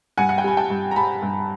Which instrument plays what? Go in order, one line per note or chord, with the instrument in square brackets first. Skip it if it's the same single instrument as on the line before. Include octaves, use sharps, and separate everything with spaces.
[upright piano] G2 F#5 G#5
F#5
G5
G3 G#5
G5 A5
G2
A#5
G3 A5 B5
G2